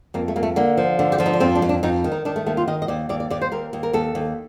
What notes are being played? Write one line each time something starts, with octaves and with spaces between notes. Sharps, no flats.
F2 A#3
A3
F2 A#3
A3
D3 A#3
F3
D3
G4
F3 F4
D#4
D4
F2 C4
D4
F2
D4
F2 D#4
D#3
D#4
D#3 D4
A3
D#2 A3
F4
D#3 D#5
D#5
D#2 D5
D#2 D5
D5
D#2 D5
C5
D#2 A#4
D#2
A#4
D#2 A4
D#2